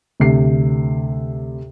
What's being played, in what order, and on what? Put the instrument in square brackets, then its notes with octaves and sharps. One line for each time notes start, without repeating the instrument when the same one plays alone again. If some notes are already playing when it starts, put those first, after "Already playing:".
[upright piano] D2 C3 C7